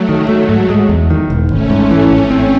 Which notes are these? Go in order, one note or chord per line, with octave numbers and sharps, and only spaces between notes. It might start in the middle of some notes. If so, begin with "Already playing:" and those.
Already playing: F#3 A3
D#3
A3
G#2
G#3
E2
D#3
E1
G#1 A3 C#4
G#2
E3 A3 C#4
G#1
C4